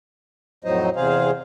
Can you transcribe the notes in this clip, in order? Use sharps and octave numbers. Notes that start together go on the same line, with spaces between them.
F2 A2 F#3 D#4 C5 D#5
E2 C3 G#4 C5 F5